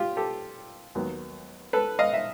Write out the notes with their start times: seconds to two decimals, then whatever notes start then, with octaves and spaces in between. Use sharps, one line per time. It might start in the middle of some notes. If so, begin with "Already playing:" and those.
Already playing: F4 G4
0.17 G4 A4
0.95 D#2 D#3 F#3 B3
1.73 A4 B4
1.99 D#5 F5
2.14 E5